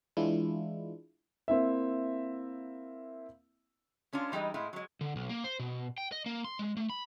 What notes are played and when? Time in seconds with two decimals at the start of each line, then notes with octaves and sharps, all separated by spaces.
0.17 E3 G#3 D4 E4 F4
1.48 A#3 C4 E4 E5
4.13 G#3 C#4 D4 F4
4.32 E3 G3 G#3 D#4 D#5
4.54 A2 G#3 E4 F4
4.73 F#3 G#3
5.01 D3
5.16 B1
5.29 A#3
5.44 C5
5.59 B2
5.98 G5
6.12 D#5
6.26 A#3
6.44 C6
6.59 G#3
6.77 A3
6.90 B5